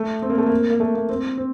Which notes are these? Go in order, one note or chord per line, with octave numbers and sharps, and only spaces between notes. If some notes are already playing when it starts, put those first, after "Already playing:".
Already playing: A3
C4
A#3
A3
A#3
A#3
A3
A#3
C4
C4